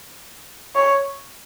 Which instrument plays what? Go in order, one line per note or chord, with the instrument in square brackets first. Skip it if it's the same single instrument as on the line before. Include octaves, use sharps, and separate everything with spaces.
[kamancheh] C#5